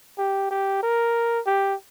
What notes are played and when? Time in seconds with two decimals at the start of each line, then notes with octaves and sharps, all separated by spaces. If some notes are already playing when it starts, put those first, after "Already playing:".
0.18 G4
0.51 G4
0.83 A#4
1.47 G4